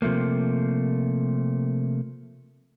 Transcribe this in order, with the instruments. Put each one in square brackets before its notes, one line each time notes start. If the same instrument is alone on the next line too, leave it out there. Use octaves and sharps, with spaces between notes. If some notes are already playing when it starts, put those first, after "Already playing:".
[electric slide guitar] C3 F3 A3 A#3